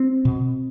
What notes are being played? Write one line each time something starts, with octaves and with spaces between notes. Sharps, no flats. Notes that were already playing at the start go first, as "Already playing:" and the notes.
Already playing: C4
B2